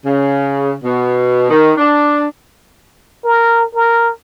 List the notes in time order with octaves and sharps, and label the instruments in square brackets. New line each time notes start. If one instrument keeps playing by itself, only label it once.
[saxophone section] C#3
B2
D#3
D4
[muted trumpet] A#4
A#4